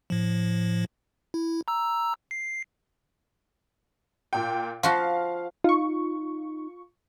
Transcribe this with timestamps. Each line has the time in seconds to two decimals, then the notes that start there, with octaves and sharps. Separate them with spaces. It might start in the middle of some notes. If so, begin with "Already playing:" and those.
0.10 A2 F3
1.34 E4
1.68 A#5 E6
2.31 C7
4.33 A#2 G5
4.83 F3 F#4 F5
5.64 D#4 F4 C#6